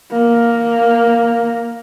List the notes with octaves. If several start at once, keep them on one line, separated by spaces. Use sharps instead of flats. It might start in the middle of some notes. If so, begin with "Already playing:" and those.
A#3